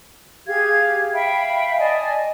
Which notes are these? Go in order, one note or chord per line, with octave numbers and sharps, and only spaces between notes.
G4 G#4 F5 G#6
E5 F5 G5 B5
D5 D#5 G#5 A5